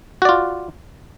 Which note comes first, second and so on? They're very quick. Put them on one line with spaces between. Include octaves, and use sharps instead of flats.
F#4 D5 F4